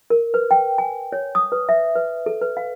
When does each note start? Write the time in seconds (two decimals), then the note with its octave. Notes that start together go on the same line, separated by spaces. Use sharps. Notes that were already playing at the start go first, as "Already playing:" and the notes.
0.10 A#4
0.34 B4
0.51 G5
0.78 G#5
1.13 C#5
1.35 D#6
1.52 B4
1.69 E5
1.95 B4
2.26 A4
2.41 B4
2.57 F5